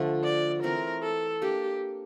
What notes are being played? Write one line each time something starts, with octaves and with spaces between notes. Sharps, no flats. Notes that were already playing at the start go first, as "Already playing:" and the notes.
Already playing: D3 F3 A3
D5
E3 A3 C4 A#4
A4
A#3 D4 G4 A4